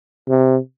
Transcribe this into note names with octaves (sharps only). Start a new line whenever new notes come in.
C3